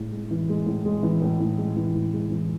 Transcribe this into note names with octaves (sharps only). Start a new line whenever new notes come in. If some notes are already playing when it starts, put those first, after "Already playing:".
Already playing: A2 G#3
G#3
E3
G#3
A2
G#3
E3
A2
A2
G#3
E3
A2
G#3
E3